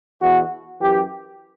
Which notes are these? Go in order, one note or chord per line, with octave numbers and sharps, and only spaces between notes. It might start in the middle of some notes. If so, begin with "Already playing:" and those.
E2 B2 F#4
F#2 E3 G4